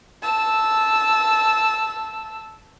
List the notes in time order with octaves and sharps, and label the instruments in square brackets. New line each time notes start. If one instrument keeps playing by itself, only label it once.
[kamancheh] A5 E6